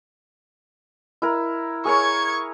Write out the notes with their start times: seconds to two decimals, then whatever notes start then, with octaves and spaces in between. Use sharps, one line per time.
1.22 E4 A#4
1.85 G#4 A#4 C#5 C#6 G#6